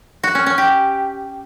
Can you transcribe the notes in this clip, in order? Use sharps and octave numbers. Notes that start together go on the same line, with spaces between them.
F#4
C#4
C#4
G4